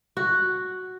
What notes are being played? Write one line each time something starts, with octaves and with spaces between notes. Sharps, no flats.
F#4